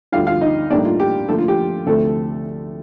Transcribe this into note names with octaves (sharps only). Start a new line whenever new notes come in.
D2 D3 G3 F4 F5
F4 F5
D#4 D#5
A2 G3 A#3 D4 D#4 D5
F4
G4
D3 F3 A3 A#3 F4 A4
F4
G4
D2 C3 F3 A3 C4 A4